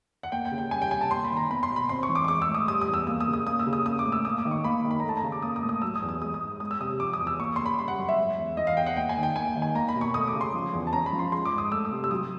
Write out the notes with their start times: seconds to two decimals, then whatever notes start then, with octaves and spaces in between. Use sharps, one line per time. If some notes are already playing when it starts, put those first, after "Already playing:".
0.23 F#5
0.32 A#3 G5
0.45 G5
0.52 C#3
0.58 G5
0.71 G3 G#5
0.82 G5
0.91 C3 G#5
1.01 A5
1.11 A#3 C6
1.25 B5
1.31 D#3
1.37 A#5
1.50 B3 B5
1.63 C6
1.70 B2
1.76 B5
1.89 C4 C6
2.03 C#6
2.09 E3
2.15 D6
2.25 C#6
2.28 G#3 D6
2.42 E6
2.49 A2
2.55 D#6
2.68 G3 D#6
2.81 D#6
2.88 E2
2.94 E6
3.07 A#3 E6
3.20 D#6
3.27 C#3
3.33 D#6
3.46 A#3 D#6
3.59 E6
3.67 C#3
3.73 D#6
3.86 A#3 D#6
3.99 D6
4.05 A2
4.12 E6
4.25 A#3 D#6
4.38 D6
4.45 D#3
4.51 C#6
4.64 A#3 B5
4.84 D#3
4.91 B5
5.00 A3 A#5
5.09 A5
5.17 A#5
5.23 C#3
5.32 D6
5.42 A#3 D#6
5.56 D#6
5.63 A2
5.69 D#6
5.82 F#3 E6
5.95 D#6
6.02 E2
6.09 D#6
6.22 G#3 D#6
6.34 D#6
6.41 G#2
6.60 G#3 D#6
6.71 E6
6.80 C3 D#6
7.00 F3 D6
7.13 D#6
7.20 E2
7.27 E6
7.39 A#3 C#6
7.56 C#3 C6
7.66 B5
7.78 G3 C6
7.88 F#5
7.98 F#2
8.09 E5
8.18 G#3
8.38 E2
8.57 E3 D#5
8.67 F5
8.77 E2 G5
8.86 F#5
8.97 A#3 G5
9.09 G#5
9.17 D#3
9.23 G5
9.36 A#3 G#5
9.56 D#3
9.62 G#5
9.75 A#3 A#5
9.88 B5
9.95 B2
10.01 C#6
10.14 A3 D#6
10.27 D6
10.34 C#3
10.41 C6
10.54 F3
10.74 E2
10.87 A5
10.93 C#4 A#5
11.06 B5
11.13 F3
11.19 C6
11.32 G#3 C6
11.45 D6
11.52 G#2
11.58 D#6
11.72 A3 E6
11.85 D#6
11.91 C3
12.04 E6
12.11 F#3 D#6